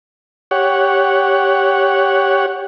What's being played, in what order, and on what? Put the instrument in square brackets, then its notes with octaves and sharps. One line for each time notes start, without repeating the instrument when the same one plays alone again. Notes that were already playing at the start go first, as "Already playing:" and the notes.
[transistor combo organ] G4 C#5 F#5